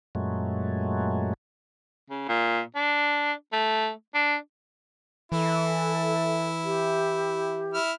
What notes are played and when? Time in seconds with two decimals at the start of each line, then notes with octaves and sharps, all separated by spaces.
0.15 F#2 A#2 F#3 G#3 A3
2.10 C#3
2.29 A#2
2.76 D4
3.53 A3
4.14 D4
5.32 E3 E4 A4
6.63 G4
7.74 E4 F6